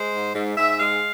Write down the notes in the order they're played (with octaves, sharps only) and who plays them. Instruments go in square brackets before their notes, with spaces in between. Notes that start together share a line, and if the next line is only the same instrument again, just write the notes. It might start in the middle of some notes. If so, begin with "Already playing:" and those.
Already playing: [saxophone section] G#3 C5
G#2
G#2
G#2 E5
G#3 F5